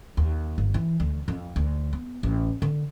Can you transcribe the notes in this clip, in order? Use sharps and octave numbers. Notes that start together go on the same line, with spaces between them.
D#2
G1
E3
D2
F2
D2
B3
A1
D3